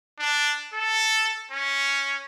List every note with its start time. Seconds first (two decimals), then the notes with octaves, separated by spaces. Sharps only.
0.19 D4
0.74 A4
1.51 C#4